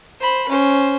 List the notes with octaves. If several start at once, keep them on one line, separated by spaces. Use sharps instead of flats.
C5 B5
C#4 C5